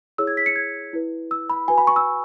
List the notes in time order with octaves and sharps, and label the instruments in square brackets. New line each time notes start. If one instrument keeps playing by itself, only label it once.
[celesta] E4 G#4 C#5 E6
G#6
B6
C#7
G#6
E4 B4
E6
B5
F#4 B4 G#5
B5
C#6
E6